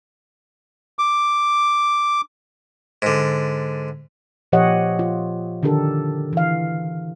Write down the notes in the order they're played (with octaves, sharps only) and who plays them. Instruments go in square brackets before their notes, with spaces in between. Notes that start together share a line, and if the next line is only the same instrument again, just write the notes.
[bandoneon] D6
[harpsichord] G#2 D3
[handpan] A#2 F3 G4 C#5 D#5 F#5
F4
D3 D#3 D4 G4 A4 A#4
E3 F5